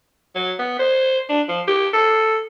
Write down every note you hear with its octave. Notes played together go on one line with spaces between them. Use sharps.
F#3
B3
C5
D4
F3
G4
A4